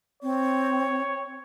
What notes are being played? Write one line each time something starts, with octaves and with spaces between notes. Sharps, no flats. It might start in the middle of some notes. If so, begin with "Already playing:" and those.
C4 C#5